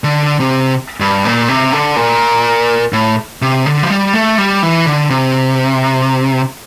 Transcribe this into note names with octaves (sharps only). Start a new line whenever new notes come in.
D3
C3
G2
A#2
C3
D3
A#2
A2
C3
D3
F3
G3
A3
G3
E3
D3
C3